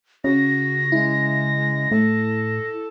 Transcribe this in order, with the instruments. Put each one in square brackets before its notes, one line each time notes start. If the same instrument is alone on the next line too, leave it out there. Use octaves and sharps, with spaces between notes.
[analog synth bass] C#3 [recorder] F#4 [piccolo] A#6
[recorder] G#3 [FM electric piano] E4
[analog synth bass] A2 [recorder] A4